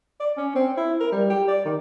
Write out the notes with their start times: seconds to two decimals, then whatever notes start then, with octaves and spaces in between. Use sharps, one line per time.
0.20 D5
0.37 C#4
0.55 C4
0.77 E4
1.01 A#4
1.12 G3
1.30 G4
1.48 D5
1.65 D#3